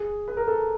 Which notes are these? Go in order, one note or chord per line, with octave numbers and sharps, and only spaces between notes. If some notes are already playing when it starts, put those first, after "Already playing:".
Already playing: G#4
B4
A#4
A4